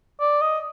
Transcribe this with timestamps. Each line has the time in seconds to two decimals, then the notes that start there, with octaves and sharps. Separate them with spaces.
0.20 D5
0.41 D#5